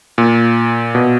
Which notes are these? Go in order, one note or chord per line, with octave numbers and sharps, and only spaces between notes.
A#2
B2